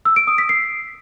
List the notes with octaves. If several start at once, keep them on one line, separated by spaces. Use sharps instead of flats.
E6
D7
D#6
B6
C7